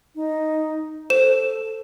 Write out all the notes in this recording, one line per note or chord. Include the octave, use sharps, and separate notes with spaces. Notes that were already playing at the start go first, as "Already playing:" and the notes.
D#4
A4 C5 E7